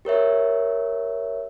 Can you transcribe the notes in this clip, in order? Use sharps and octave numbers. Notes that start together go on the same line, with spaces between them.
G4 A#4 C#5 E5